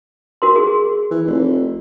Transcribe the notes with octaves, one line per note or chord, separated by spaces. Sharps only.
F#4 A#4 C6
G#4
E3
F1